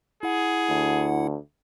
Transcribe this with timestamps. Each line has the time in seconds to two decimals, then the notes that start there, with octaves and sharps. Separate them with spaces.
0.23 E4 G#4 F#5
0.69 D2